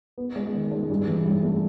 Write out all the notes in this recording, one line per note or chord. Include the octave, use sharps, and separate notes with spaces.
B3
G#3
D#3
G#3
G2
E3
G2
A3